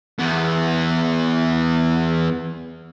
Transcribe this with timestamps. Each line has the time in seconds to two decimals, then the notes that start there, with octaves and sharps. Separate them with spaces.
0.19 E2 B3